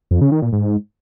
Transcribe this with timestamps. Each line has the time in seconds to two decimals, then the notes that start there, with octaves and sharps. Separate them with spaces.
0.11 F2
0.21 C#3
0.32 D#3
0.42 A#2
0.52 G#2